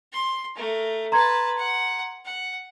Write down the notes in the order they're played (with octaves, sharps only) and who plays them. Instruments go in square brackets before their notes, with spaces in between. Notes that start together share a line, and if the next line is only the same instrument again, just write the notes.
[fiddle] C6
A3 A#4
[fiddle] B4 A5 [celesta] A#5 C6 G#6
[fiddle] F#5
F#5